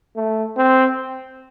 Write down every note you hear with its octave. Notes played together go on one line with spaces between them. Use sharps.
A3
C4